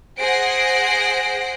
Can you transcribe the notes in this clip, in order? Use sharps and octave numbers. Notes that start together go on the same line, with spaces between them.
G#4 C5 F#5 A#6 C7 D7